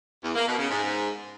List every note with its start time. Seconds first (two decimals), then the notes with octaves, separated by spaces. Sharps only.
0.24 E2
0.36 A#3
0.47 B2
0.59 C#3
0.70 G#2